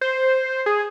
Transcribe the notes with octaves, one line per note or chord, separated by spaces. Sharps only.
C5
G#4